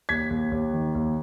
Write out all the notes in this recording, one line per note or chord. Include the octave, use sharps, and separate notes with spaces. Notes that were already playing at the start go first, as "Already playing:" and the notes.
D#2 G#6 B6
D#2
D#2
D#3
D#2